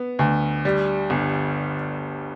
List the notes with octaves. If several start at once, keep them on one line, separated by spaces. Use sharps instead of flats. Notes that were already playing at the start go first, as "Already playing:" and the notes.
Already playing: B3
D2
G3
G1